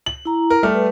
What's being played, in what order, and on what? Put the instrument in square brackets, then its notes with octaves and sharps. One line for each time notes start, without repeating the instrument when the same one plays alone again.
[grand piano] F#7
[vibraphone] E4 A#5
[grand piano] A#4
G3 A3 F6
[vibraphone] B4